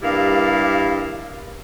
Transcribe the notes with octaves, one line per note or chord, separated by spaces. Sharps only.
G2 G3 A#3 E4 F5